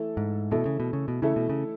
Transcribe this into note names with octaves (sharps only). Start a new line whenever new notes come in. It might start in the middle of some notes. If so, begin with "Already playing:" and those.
Already playing: E3 A3 E4 A4
G#2
B2 E3 A3 E4 A4
C#3
B2
C#3
B2
C#3 E3 A3 E4 A4
B2
C#3